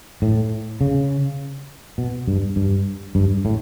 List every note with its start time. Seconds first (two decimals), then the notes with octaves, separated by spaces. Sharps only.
0.22 A2
0.81 C#3
1.98 B2
2.28 G2
2.56 G2
3.15 G2
3.45 A2